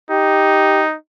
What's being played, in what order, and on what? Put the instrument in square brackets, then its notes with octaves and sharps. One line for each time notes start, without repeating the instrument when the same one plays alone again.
[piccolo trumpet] D#4 [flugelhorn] G4